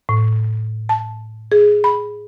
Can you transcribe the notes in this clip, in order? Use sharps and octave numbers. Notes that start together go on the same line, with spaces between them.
A2
A5
G#4
B5